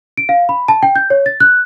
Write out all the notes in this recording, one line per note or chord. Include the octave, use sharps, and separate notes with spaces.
D7
F5
B5
A5
G5
G6
C#5
A6
F#6